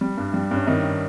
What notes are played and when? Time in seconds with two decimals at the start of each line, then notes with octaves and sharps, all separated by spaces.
0.01 G3
0.18 G2
0.34 G3
0.51 G2 C#4
0.67 G2 D#3 D#4